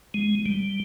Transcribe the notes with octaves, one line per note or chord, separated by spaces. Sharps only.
G#3
G3